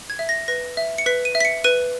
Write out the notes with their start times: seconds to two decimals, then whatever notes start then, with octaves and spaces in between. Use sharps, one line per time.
0.10 G#6
0.19 E5
0.29 A#6
0.48 B4 A#6
0.77 E5
0.98 C#7
1.06 B4 B6
1.25 D#7
1.35 E5
1.41 B6
1.45 C#7
1.64 B4 D#7